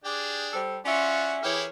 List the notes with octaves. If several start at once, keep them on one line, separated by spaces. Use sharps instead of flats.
D4 G4 G#4
G3 A4 C5
C#4 F4 F#4 D5 E5
E3 E4 G4 G#4 A#4 C#5